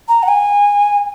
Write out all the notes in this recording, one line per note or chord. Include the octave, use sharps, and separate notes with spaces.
A#5
F#5
G#5